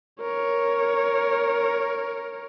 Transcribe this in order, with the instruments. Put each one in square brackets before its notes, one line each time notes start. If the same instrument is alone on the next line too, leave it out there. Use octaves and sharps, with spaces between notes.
[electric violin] A#4 C#5